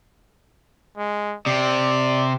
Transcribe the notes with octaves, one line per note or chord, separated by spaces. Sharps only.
G#3
C3 D5